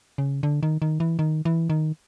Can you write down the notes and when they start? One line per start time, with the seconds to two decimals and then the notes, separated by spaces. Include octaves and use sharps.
0.18 C#3
0.43 D3
0.63 D#3
0.82 D#3
1.00 E3
1.19 D#3
1.45 E3
1.70 D#3